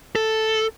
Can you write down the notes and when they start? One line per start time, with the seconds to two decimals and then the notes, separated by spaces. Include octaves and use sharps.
0.15 A4